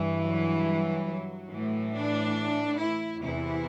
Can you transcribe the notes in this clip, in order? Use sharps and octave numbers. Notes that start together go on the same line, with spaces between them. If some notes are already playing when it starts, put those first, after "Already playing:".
Already playing: G2 E3
F#3
F#3
A2 E3
D4
E4
E2 C3 E3 E4